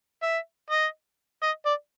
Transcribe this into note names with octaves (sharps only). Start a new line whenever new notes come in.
E5
D#5
D#5
D5